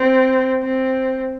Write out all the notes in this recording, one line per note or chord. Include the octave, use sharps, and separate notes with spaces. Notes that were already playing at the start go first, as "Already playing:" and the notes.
Already playing: C4
C4